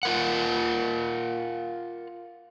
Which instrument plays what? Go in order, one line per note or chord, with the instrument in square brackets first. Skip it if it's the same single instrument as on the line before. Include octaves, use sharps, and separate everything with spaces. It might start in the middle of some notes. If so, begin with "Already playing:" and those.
[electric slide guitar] F4 A#4 F#5